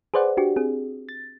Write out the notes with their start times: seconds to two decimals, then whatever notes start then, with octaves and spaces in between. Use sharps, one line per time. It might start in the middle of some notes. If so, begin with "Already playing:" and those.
0.14 G#4 B4 C5 D5 F#5
0.37 D4 F#4 G4
0.56 C4 G#4
1.09 A6